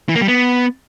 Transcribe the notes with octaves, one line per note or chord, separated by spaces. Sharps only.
E3
A#3
G3
B3